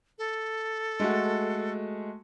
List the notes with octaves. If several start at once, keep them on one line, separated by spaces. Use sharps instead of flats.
A4
G#3 A3 F#4